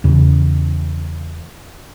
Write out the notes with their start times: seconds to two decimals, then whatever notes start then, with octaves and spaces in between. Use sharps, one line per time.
0.04 E2 C#3